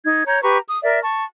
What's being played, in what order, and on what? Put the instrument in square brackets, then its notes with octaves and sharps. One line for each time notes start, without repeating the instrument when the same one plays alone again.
[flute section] D#4 G#6
C#5 A#5 G6 G#6
G4 B4 A#5 C#6
D#6
A#4 D5 E5
A5 C#6